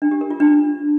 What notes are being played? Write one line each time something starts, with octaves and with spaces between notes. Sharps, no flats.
D4
G4
A#4
F4
D4